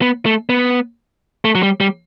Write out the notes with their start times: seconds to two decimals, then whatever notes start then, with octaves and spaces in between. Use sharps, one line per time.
0.02 B3
0.26 A3
0.49 B3
1.45 A3
1.55 F#3
1.63 G3
1.80 G3